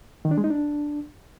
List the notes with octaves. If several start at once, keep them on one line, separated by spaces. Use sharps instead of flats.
D#3
D4
G#3
D#4
D4